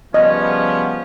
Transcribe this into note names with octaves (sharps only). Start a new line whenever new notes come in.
C#3 F3 G3 B3 C#4 D#5